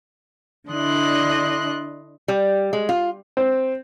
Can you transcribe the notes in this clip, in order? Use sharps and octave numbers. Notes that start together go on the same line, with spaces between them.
D3 D4 E4 D#5 C6 F#6
G3
G#3
F4
C4